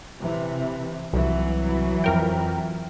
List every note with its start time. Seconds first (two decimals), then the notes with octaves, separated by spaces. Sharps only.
0.20 C3 E3
1.13 C2 E3 F#3
2.04 F2 A#4 G5